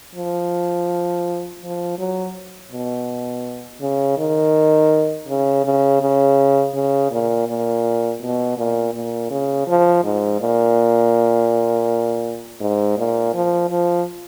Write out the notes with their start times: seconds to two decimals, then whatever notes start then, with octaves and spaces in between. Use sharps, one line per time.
0.15 F3
1.62 F3
1.99 F#3
2.72 B2
3.81 C#3
4.18 D#3
5.28 C#3
5.65 C#3
6.01 C#3
6.75 C#3
7.11 A#2
7.47 A#2
8.22 B2
8.57 A#2
8.94 A#2
9.30 C#3
9.68 F3
10.04 G#2
10.41 A#2
12.60 G#2
12.98 A#2
13.34 F3
13.70 F3